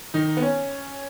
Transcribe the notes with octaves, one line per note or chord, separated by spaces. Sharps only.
D#3 D#4
B3
C#4